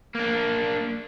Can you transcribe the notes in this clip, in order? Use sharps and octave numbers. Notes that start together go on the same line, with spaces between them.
A#3 D4